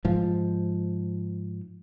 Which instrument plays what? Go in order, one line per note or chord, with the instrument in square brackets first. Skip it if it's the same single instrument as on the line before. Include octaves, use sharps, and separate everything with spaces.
[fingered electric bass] G#2 F3